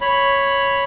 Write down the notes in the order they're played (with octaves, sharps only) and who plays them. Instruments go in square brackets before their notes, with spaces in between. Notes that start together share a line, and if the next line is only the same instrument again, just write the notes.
[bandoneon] C#5 B5